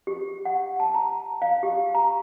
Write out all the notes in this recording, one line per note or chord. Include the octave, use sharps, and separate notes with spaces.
G4
F#5
A5
A#5
F5
G4
A#5